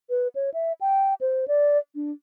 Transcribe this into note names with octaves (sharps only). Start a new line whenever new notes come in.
B4
C#5
E5
G5
C5
D5
D4